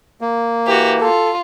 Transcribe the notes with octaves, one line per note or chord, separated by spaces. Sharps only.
A#3
E3 F#4 G4
F4 A4